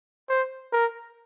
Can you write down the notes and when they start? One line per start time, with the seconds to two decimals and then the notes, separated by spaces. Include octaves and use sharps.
0.29 C5
0.72 A#4